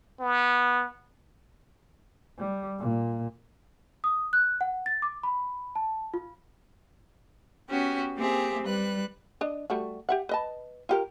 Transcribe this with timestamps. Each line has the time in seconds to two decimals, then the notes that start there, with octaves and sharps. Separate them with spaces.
0.20 B3
2.39 G3
2.79 A#2
4.04 D#6
4.33 F#6
4.61 F#5
4.86 A6
5.02 D6
5.23 B5
5.76 A5
6.14 F4
7.69 B3 C#4 F#4 G4
8.16 A#3 C4 G4 G#4 E5
8.62 G3 B4 F#6
9.41 D4 D#5
9.70 G3 A3 F#4
10.09 G4 E5 F#5
10.29 B4 D#5 A5
10.89 F4 G4 A#4